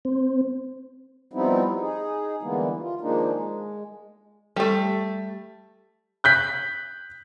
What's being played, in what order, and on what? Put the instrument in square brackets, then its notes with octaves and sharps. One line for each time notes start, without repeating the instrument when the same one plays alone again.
[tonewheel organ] C4
[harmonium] F3 G3 B3 C4 D#4 E4
D#4 G#4
D3 E3 G3 G#3 A#3 B3
F4
D#3 F3 G#3 A#3 D4 D#4
G#3
[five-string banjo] G3 A3
[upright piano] F#6 G6 B6